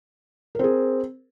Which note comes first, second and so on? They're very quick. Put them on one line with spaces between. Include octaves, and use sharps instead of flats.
A#4 C4 G#4